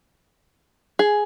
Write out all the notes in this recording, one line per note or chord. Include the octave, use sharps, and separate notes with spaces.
G#4